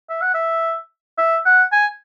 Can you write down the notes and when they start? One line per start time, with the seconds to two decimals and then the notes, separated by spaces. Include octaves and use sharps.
0.10 E5
0.22 F#5
0.34 E5
1.18 E5
1.45 F#5
1.72 G#5